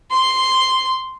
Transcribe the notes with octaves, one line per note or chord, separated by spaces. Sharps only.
C6